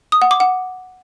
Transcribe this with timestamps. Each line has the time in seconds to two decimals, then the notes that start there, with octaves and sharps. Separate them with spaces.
0.12 D#6
0.22 F#5
0.31 D6
0.40 F#5